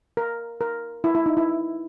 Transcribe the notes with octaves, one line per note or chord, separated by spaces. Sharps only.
A#4
A#4
E4
E4
D#4
E4